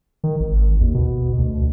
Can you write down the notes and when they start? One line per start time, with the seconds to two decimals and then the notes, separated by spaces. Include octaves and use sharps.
0.24 D#3
0.40 G#1
0.81 D#2
0.94 B2
1.38 D2